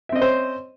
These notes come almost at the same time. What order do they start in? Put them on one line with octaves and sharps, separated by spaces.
E5 C4 D#5 C#4 C5